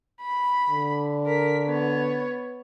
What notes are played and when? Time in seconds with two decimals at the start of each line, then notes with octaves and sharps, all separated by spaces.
0.22 B5
0.69 D3
1.26 A#4 B6
1.66 B3 C#5